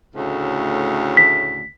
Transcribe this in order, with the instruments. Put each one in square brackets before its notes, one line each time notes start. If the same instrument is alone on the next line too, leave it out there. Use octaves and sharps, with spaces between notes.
[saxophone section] D2 A2 C#3
[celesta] B6